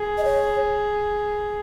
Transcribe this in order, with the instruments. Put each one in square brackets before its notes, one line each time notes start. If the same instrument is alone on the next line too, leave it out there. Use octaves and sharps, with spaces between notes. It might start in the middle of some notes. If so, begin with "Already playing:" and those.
Already playing: [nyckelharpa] G#4
[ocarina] D#5
C#5